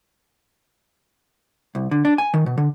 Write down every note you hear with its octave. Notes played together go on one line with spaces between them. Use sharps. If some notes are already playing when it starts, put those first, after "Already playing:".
C2
D3
D4
G#5
D#3
B2
D3